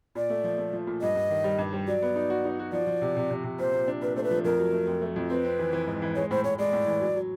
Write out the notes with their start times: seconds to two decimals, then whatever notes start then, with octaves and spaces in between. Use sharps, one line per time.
0.15 A#2 D5
0.30 A3
0.44 F3
0.58 A3
0.73 F3
0.87 A#2
1.02 G2 D#5
1.16 G2
1.30 D#3
1.44 G3
1.58 G2
1.73 G3
1.87 F#3 D5
2.02 B3
2.16 D#4
2.30 F#4
2.45 D#4
2.59 F#4
2.73 F3 D5
2.87 F3
3.02 C3
3.17 C3
3.31 C3
3.44 C3
3.59 A#2 C5
3.73 A#2
3.88 D4
4.02 A#2 B4
4.16 A3 C5
4.24 B4
4.31 F3
4.44 F2 A#4
4.59 F#3
4.73 A3
4.87 F2
5.02 A3
5.16 F2
5.30 C4 B4
5.45 C4
5.59 E3
5.73 E3
5.87 G#2
6.02 E3
6.16 G#3 C#5
6.31 A2 C5
6.44 A2 C#5
6.59 G#3 D5
6.73 A2
6.87 E3
7.01 F#3
7.16 F#3